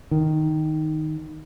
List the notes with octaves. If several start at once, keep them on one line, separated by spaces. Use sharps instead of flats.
D#3